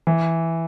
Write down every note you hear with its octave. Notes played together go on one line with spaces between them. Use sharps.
E3